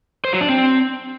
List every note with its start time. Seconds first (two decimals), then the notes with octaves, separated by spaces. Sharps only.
0.25 C5
0.33 F#3
0.41 D4
0.49 C4